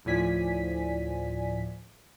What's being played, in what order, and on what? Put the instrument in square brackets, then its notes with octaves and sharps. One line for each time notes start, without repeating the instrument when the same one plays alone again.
[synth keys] D2 A2 F3 D5 G#5 B6